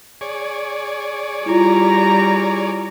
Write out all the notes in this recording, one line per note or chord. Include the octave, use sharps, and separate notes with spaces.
G#4 C#5 D5
G3 E4 F4 A#5